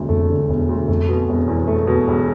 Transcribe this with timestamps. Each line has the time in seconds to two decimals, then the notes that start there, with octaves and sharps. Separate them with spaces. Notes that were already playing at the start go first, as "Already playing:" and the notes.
Already playing: E1 D2 D3
0.09 F2 A3
0.30 D3
0.49 E1 E2
0.69 D2
0.88 F2 A3
1.09 B2
1.29 E1
1.48 E2
1.68 A3
1.87 B2
2.08 E1